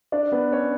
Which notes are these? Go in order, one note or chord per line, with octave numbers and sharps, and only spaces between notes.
D4 D5
B3 B4
C#4 C#5